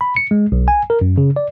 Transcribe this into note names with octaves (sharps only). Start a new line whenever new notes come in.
B5
C#7
G#3
B1
G#5
A#4
F#2
C#3
D5